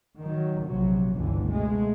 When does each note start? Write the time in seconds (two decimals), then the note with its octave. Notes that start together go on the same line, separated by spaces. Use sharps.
0.21 D#3 F#3
0.63 A#1 C3 F#3
1.13 G1 C#2 A#2 D3 E3
1.47 B2 G#3 A3